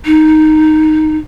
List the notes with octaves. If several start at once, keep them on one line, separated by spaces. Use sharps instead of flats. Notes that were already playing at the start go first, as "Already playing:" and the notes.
D#4